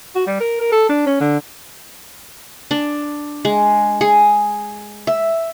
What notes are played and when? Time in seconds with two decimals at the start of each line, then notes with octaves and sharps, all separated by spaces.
0.15 F#4
0.26 G3
0.40 A#4
0.60 A#4
0.72 A4
0.89 D4
1.06 C#4
1.20 D3
2.71 D4
3.45 G#3
4.01 G#4
5.07 E5